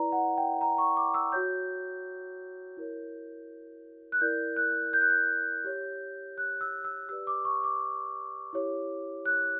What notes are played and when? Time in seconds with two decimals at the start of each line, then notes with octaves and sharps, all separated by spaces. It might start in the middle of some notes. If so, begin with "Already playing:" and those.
Already playing: E4 B4 D5 A#5
0.12 F#5
0.37 G5
0.61 A#5
0.78 C#6
0.97 D6
1.14 E6
1.32 F#4 C#5 G6
2.77 E4 A#4 C#5
4.12 F#6
4.21 E4 A#4 D5 G6
4.57 F#6
4.93 G6
5.01 F#6
5.10 G6
5.64 G4 C#5
6.38 F#6
6.61 E6
6.85 E6
7.09 G4 B4 D5 E6
7.27 D6
7.45 C#6
7.64 D6
8.53 E4 G4 C#5
9.26 F#6